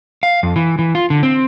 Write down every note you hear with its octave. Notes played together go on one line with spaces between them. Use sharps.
F5
F2
E3
E3
F4
D3
C4